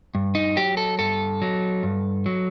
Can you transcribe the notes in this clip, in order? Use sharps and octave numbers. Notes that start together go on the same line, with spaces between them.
G2
D#4
F#3 G4
A4
G2 A4
F#3
G2
F#3